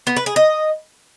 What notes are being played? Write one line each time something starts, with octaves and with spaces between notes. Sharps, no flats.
B3
B4
G#4
D#5